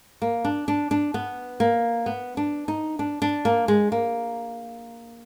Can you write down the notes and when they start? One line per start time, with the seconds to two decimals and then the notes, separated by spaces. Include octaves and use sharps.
0.22 A#3
0.45 D4
0.68 D4
0.91 D4
1.14 B3
1.60 A#3
2.06 B3
2.37 D4
2.68 D#4
2.99 D4
3.22 D4
3.45 A#3
3.68 G#3
3.92 A#3